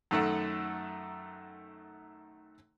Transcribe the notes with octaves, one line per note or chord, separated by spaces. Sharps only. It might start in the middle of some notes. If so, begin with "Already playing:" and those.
F#2 D#3 A3 A4 F#5